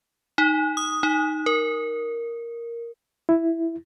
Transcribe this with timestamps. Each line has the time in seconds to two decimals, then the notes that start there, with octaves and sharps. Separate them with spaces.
0.38 D#4
0.77 D#6
1.03 D#4
1.46 A#4
3.29 E4